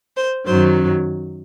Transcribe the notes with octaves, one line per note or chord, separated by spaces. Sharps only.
C5
F#2 D#3 F#3 C5